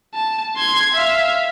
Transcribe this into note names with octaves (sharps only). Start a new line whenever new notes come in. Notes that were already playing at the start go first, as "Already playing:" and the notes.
A5
C6 G#6
E5 F5